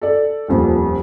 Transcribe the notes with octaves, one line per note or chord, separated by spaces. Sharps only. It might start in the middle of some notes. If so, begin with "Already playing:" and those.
A4 D5
D#1 F2 A#2